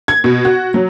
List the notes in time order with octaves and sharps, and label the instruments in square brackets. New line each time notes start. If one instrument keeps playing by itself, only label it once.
[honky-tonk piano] G#6
B2
F#4
F#3